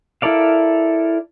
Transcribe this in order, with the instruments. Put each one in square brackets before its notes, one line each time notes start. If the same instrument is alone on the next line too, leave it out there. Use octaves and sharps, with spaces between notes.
[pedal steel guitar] E4 A4 A#4 D5 F5